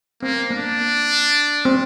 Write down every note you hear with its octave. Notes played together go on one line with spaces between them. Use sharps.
A#3 C4
A#3 D4
C4